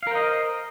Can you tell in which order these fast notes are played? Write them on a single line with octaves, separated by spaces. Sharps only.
F5 A#4 C5 D#5